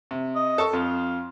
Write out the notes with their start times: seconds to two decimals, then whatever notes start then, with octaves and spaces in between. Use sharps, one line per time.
0.11 C3
0.36 D#5
0.58 A4 C#6
0.73 F2 F4